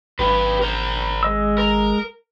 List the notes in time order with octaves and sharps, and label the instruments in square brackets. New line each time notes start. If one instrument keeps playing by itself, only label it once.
[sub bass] G#1 [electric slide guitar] G4 B4
[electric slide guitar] A#4 C5
[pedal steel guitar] G#3 D#5 E6
[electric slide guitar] A#4